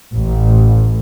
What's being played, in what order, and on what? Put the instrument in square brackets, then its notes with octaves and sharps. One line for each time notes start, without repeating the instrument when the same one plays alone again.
[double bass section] A1